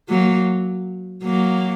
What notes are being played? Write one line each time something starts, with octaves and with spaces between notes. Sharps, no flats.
F#3 A#3
F#3 A#3